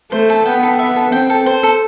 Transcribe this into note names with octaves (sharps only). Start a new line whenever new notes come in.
A3 C5
A4
B3 G5
A4
E5
A4
C4 G5
A4
C5
A4